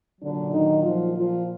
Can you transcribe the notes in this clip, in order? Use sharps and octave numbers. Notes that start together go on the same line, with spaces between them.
A#2 D3 F#3 D4
D#3 D#4
F3 F4
F3 F4